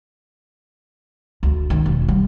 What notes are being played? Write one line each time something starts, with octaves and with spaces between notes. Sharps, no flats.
D2
D#3
E1
G3